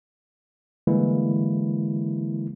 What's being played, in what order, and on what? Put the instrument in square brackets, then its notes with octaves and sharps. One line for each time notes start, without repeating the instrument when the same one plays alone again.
[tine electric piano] D3 E3 G3 G#3 A#3 E4